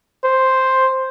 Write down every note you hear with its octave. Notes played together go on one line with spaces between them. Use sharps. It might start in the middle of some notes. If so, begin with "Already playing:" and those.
C5